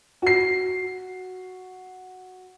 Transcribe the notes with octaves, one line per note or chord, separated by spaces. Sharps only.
F#4 C7